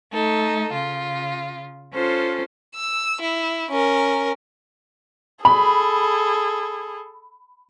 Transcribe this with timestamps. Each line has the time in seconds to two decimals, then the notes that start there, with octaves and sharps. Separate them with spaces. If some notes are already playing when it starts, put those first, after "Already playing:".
0.13 A3 D#4 A4
0.71 C#3 F4
1.93 C#4 F4 A4 C5
2.75 E6
3.21 E4
3.71 C#4 A#4
5.45 G#4 A4 B5